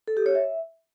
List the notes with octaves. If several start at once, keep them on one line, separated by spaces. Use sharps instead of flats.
A4
G4
C#5
E5